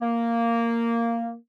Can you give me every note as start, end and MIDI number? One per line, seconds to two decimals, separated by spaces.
0.02 1.35 58